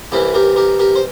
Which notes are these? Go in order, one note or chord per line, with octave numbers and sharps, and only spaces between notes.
C2 C3 E3 E4 G4
G4 A#4
G4 A#4
G4 A#4
C5